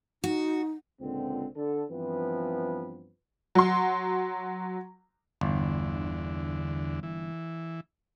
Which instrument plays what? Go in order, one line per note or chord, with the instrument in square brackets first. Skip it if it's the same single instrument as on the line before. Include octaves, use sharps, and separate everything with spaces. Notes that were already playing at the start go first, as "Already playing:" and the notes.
[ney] D#4 [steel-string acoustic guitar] F#4
[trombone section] C#2 A#2 D3 G#3 C4
D3 A4
G2 E3 F3 B3 C4 B4
[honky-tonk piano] F#3 C6
[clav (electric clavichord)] G1 [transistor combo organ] E2 D3
[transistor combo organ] E3